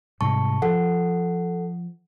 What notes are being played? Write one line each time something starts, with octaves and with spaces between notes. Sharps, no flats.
G#2 C3 G3 A5 C#6
F3 A4 F#5